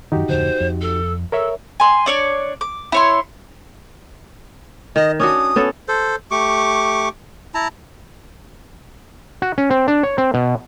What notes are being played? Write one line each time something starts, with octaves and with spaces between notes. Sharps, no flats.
F#2 D#3 D#4 F#4 G4
D1 F2 D3 C5
F2
A4
A4 A#4 C#5 E5
G#5 C6
D4 C#5 D5
D6
E4 C#5 C6
D#3 D#5
C#4 D4 F#4 D#6
B3 C#4 A4
A4 C5
A3 G4 C#6 D6
E4 A5 A#5
F#4
C#4
C4
D4
C#5
C4
B2